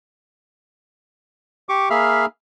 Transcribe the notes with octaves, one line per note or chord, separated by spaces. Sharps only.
G4 C#6 D6
A#3 G#4 E5 F5 B5 F6